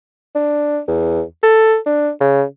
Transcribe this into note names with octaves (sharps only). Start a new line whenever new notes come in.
D4
E2
A4
D4
C#3